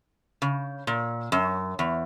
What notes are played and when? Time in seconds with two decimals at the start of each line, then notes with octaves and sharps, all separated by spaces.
0.42 C#3
0.87 A#2
1.32 F#2
1.79 E2